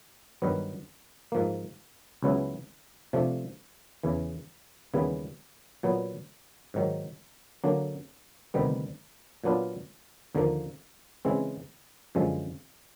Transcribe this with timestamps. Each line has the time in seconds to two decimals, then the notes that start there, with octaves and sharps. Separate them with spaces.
0.42 G2 D#3 F#3 B3
1.32 G#2 F3 A#3
2.23 C#2 C#3 F#3 B3 E4
3.13 C3 F3 A3 D4
4.03 E2 C#3 E3
4.94 D#2 C#3 E3 G3 B3
5.83 A#2 F#3 B3
6.74 G#2 D#3 F#3
7.64 D3 F#3 A#3 D4
8.54 D2 C3 D#3 G3 B3
9.44 A#2 F#3 B3 D4 F4
10.35 D#2 D3 F3 A#3
11.25 C#3 E3 G#3 C4
12.15 F#2 D3 F3 G#3